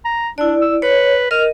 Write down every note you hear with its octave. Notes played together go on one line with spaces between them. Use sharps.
A#5
D4 E4 D5
E6
B4 C#5
A#4 D#5 F6